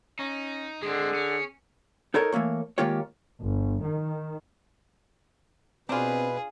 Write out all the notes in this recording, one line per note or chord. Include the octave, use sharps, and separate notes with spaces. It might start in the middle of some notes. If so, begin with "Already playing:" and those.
C#4 D#4
D3 G#3 C4 G#4
C#4
D#4 A4 A#4 C#5 D#5
E3 A3 A#3 C#5
D#3 G#3 A#3 F4 G4 C#5
G1
D#3
B2 C4 D4 F4 G#4 B4